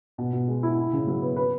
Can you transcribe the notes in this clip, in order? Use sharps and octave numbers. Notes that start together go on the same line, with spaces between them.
B2
B2
G#3
E4
E4
C#3
F#3
B3
B4